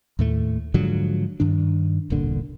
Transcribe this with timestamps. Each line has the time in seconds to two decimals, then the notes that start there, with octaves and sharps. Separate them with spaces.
0.19 D#2 A2 A3
0.74 G#2 D3 F3 F#3
1.40 G2 D#3 D4
2.10 E1 C2 A#2 D3